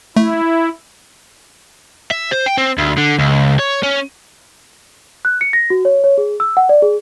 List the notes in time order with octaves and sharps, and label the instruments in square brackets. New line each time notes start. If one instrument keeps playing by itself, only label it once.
[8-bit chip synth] A3 [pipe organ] E4
[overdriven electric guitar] E5
C5
G5
C4
D2
D3
C#2
C#5
C#4
[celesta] F#6
C#7
A#6
F#4
C#5
C#5
G#4
E6
F#5
D5
G#4